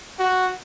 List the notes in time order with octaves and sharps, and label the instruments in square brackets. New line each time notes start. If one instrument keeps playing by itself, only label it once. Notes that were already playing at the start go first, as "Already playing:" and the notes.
[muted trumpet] F#4